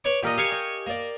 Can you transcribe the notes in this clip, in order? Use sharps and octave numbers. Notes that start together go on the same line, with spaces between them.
B4 C#5 D6
A#2 G4 A#4 D#5
G4 F5 G#5 C#6
D#5
A#3 D5